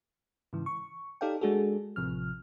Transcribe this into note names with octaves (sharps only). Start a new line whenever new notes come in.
G#2 C#3 E3
C#6
D#4 G4 A4 D5 F5 G5
G#3 D4 F#4 G#4 A4
A1 C3 F3 F6